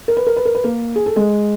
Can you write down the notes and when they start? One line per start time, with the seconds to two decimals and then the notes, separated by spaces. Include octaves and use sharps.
0.08 A#4
0.17 B4
0.27 A#4
0.37 B4
0.45 A#4
0.55 B4
0.64 A#3 A#4
0.96 G#4
1.06 A4
1.16 G#3 G#4